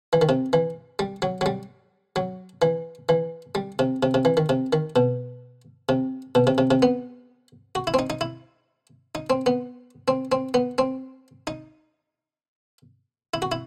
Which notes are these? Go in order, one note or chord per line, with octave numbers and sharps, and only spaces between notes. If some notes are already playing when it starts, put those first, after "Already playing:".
E3
D#3
C3
E3
G3
F#3
F#3
G3
F#3
E3
E3
G3
C3
C3
C3
E3
D#3
C3
D#3
B2
C3
B2
C3
C3
C3
B3
F#4
E4
C4
D#4
D#4
E4
D#4
C4
B3
C4
C4
B3
C4
D#4
E4
F#4
E4